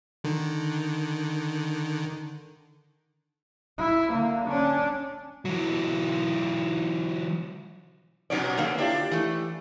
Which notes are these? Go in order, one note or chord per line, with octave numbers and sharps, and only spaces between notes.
D3 D#3
E4
D3 A#3
C#4 D4
E3 F#3
A#2 F#3 C#4 D#4 D5
D3 A#3
D4 E4 F4 G4
E3 A3